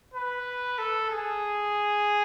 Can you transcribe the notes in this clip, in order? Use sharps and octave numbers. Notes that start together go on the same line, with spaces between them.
B4
A4
G#4